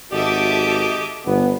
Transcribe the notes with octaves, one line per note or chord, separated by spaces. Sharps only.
G#1 F#4 G4 A4 D#5 E5 D6
G1 B3